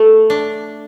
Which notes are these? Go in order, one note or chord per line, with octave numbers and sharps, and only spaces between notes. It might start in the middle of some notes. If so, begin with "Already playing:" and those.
Already playing: A3
D4